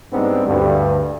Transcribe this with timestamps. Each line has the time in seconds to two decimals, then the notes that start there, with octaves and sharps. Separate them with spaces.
0.13 G#2 G3 B3 C4 D4
0.47 D2 G2